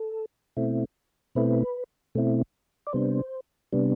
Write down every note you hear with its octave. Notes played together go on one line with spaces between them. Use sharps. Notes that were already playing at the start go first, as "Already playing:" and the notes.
Already playing: A4
B2 A3 C4 E4
B2 A3 C4 E4 B4
B2 A3 C4 E4
D5
C3 G3 B3 D4 C5
C3 G3 B3 D4